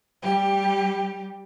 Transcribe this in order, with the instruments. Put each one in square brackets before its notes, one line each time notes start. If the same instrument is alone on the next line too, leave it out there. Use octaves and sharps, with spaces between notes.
[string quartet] G3 G4